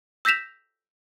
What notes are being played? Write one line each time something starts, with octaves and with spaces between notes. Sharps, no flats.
E6 G6 A#6 B6 E7 F7